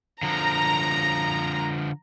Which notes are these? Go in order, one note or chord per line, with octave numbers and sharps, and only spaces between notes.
D3 F3 A#5